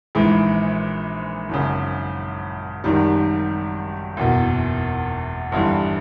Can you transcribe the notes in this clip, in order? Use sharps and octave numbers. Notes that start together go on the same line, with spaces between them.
A#1 G#2 E3 G#3
G#1 F#2 C#3
G#1 F#2 D#3 G3
F#1 E2 B2
G1 G2 E3 G3